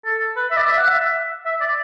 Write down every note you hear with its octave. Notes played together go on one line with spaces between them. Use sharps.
A4
B4
E5
D5
E5
F#5
E5
E5
D5